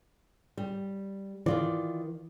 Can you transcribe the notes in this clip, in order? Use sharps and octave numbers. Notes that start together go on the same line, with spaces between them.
G3
D#3 E3 F4 D5